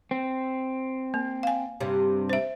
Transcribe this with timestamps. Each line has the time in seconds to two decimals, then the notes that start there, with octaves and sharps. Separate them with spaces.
0.11 C4
1.14 A#3
1.43 F5 G#5
1.80 G2 C3
2.29 C5 E5